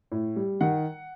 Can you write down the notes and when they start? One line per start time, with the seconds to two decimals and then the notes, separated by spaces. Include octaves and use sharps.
0.12 A2
0.36 G3
0.61 D#3 F#5